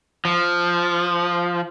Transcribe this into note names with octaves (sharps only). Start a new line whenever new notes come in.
F3